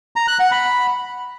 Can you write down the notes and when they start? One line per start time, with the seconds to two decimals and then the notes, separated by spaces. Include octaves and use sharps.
0.16 A#5
0.28 F#6
0.40 F#5
0.51 B5